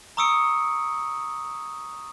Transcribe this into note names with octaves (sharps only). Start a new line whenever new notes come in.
A#5 C#6 D#6 E6 C#7 D7